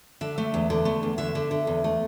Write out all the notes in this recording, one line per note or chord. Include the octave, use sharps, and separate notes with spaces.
D3 E5
A3
E2
D3
A3
E2
D3 E5
D3
D3
E2
A3